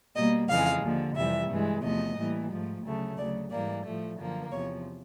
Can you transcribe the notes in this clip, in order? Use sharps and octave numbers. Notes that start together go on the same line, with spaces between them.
B2 G3 A#3 D#5
F2 C#3 E3 G#3 F5
D#2 D3 F3
F2 C3 E3 G3 E5
G2 E3 G#3
E2 C3 F3 A3 D#5
A2 E3 G3 A#3
G#2 F3 A3
D2 C#3 F#3 A3
D2 C#3 F#3 D5
G#2 E3 G3 A#3 D5
A2 F3 A3
F#2 D3 F3 A#3
E2 C3 F3 C#5